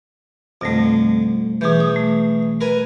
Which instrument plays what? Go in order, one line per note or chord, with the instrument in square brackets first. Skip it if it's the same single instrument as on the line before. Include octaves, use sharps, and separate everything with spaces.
[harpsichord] F2 D3 [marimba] B2 G3 A3
[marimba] B2 G#4 G6 [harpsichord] E3 C#4
[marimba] D#6
A3
[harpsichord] A#4 B4 G#5